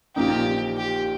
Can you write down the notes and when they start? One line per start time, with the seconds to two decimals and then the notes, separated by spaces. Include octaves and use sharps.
0.16 A#1 A#2 A#3 D#4 G4
0.77 G4